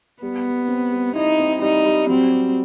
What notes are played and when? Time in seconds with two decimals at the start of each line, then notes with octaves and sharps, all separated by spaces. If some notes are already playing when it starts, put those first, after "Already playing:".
0.23 G3 B3
0.46 G3
0.68 C4
0.92 G3
1.15 D#4 E4
1.39 C4
1.62 G3 D#4
1.85 G3
2.09 F#3 C4
2.31 G4